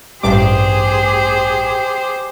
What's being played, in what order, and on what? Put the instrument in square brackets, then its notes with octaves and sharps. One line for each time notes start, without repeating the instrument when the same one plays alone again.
[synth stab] A1 G2 D6 [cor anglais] G4 [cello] G#4 [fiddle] C5